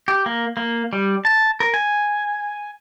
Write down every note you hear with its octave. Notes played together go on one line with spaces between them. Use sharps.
G4
A#3
A#3
G3
A5
A#4
G#5